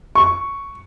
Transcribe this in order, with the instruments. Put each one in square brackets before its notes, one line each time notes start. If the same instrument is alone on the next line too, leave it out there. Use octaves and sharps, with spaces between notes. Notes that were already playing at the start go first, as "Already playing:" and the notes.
[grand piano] C#6